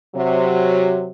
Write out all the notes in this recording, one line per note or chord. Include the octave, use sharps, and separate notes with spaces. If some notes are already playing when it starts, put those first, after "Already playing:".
C3 F#3